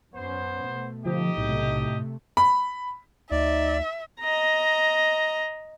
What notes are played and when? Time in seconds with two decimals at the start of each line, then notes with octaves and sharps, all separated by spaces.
0.15 F#2 B3 C#4 C5
0.66 B2 A3
1.06 D3 F3 D#4 G4 D#5
1.37 B1 A2 C3 A3
2.37 B5
3.31 D2 D#4 D5 E5
4.20 D#5 A#5